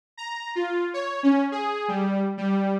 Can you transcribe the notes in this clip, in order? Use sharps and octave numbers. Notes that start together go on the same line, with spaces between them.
A#5
F4
C#5
C#4
G#4
G3
G3